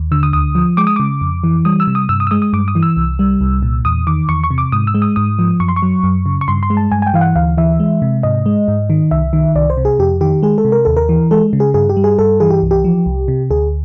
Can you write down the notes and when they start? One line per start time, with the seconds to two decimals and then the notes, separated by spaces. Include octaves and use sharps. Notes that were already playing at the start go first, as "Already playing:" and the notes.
Already playing: D#2
0.12 D3 E6
0.23 D#6
0.33 D2 D#6
0.55 F3
0.77 G#3 D6
0.87 D#6
0.96 C#3 D6
1.21 F2
1.44 E3
1.65 G3 D#6
1.80 E6
1.87 C3
1.95 D#6
2.09 G2 E6
2.20 D#6
2.27 E6
2.31 G#3 D#6
2.42 D#6
2.53 G2 D6
2.68 D#6
2.75 E3
2.83 E6
2.97 C2
3.19 G3
3.41 C2
3.62 A#2
3.85 E2 D#6
4.07 D#3 D6
4.29 E2 C#6
4.44 C#6
4.51 C3
4.58 D6
4.72 G#2 D#6
4.87 E6
4.94 G#3
5.02 D#6
5.16 G#2 D#6
5.39 F3
5.60 F#2 C#6
5.69 C6
5.76 C#6
5.82 F#3
6.04 F#2
6.26 C#3
6.41 C#6
6.48 G2 C6
6.63 C6
6.70 G#3
6.77 A5
6.92 G2 G#5
7.02 G#5
7.07 G5
7.14 E3 F5
7.21 F#5
7.35 D2 F5
7.58 E3 E5
7.80 G#3
8.02 C3
8.23 G#2 D#5
8.46 G#3
8.68 G#2
8.90 D#3
9.11 C2 E5
9.33 D#3
9.55 C2 D5
9.70 C5
9.77 C3
9.85 G#4
9.99 F2 G4
10.21 D#3 G4
10.42 G#3 G#4
10.58 A4
10.65 C3
10.72 A#4
10.85 D#2 A4
10.97 A#4
11.09 E3
11.31 G#3 A4
11.53 C#3
11.60 G#4
11.74 G2 G#4
11.89 G4
11.97 G3
12.04 G#4
12.19 G2 A4
12.40 E3 G#4
12.50 G4
12.62 C2
12.71 G4
12.84 F3
13.06 C2
13.28 C3
13.50 D2 G#4